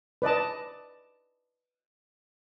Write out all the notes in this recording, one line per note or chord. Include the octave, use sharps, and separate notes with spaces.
B4 D5 D#5 A5